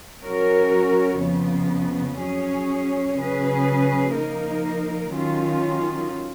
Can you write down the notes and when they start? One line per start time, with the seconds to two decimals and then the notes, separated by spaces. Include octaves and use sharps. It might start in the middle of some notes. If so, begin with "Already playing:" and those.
0.23 F#3 C#4 F#4 A#4 C#5
1.20 F2 C#3 F3 B3
2.18 F#3 C#4 G#4 C#5
3.15 C#3 F#3 C#4 G#4 B4
4.14 F3 A#3 D#4 A#4
5.12 D#3 F#3 C#4 F4